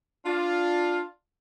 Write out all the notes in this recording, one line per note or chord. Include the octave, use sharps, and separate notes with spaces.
D4 F4